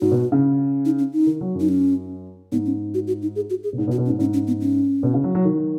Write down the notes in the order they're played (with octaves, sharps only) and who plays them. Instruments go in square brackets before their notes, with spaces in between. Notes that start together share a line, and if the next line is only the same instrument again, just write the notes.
[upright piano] G#2 [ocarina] F#4
[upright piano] B2
C#3
[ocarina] D#4
C#4
D#4
[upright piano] D#3
F#3
F#2
[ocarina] D#4
C#4
[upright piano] G#2 [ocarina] B3
[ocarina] C#4
F#4
F#4
D#4
G#4
F#4
G#4
[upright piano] B2
G#2
B2
[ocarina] F#4
[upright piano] B2
[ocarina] C#4
[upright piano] G#2
[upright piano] G#2 [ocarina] C#4
[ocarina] C#4
B3
C#4
[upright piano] B2
C#3
F#3
F#3
D#3